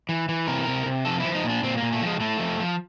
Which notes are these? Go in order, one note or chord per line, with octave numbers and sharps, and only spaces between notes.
E3
E3
C3 A#4
C3
C3
F3 A4
F3 E4
D#4
A#2
D4
A#2 C4
A#3
A#2
A3
F3 G#3
A2 A3
F3
F3